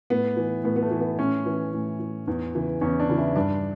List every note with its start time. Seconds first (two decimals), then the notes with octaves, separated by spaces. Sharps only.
0.10 A2 B3
0.37 E3
0.64 A2 B3
0.76 B3
0.82 A3
0.91 E3
1.00 B3
1.19 A2 C#4
1.46 E3
1.74 A2
2.00 E3
2.27 E2
2.55 C#3 E3
2.81 E2 C#4
3.00 D4
3.09 C#3 E3
3.18 E4
3.36 G2 D4